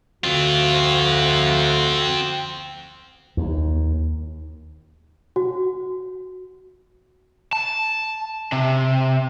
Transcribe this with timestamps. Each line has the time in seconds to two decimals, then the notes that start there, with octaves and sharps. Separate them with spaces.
0.24 D2 D3 C4 F4 F#4
3.37 D#2
5.36 F#4
7.53 A5
8.52 C3